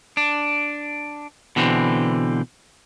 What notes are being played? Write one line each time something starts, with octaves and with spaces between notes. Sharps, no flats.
D4
B2 D3 E3 C4